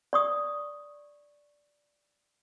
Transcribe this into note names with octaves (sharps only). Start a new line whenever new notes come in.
D5 C#6 D#6